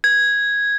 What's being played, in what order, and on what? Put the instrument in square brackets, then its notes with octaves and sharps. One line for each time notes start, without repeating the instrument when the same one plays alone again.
[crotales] G#6